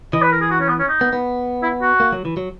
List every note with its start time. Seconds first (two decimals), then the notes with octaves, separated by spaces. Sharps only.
0.13 E3 D#5
0.22 B4
0.32 A#4
0.42 G#4
0.51 F#4
0.60 C#4
0.69 B3
0.79 C#4
0.88 D#4
1.01 B3
1.13 B3
1.62 E4
1.82 F#4
2.00 A#3
2.12 F#3
2.25 E3
2.37 F#3